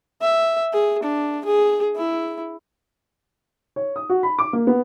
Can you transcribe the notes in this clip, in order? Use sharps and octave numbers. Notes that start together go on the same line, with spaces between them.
E5
G#4
D4
G#4
E4
C#5
D#6
F#4
B5
D6
A#3
B3